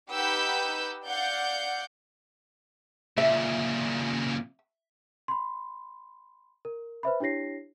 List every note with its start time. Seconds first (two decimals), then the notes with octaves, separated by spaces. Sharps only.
0.11 D#4 G4 B4 F#5 E6 G6
1.07 D5 F5 F#5 G6
3.18 A#2 C#3 E5
5.28 B5 C6
6.65 A#4
7.03 B4 C5 E5 B5
7.20 D4 E4 G4 C#5 A#6 C7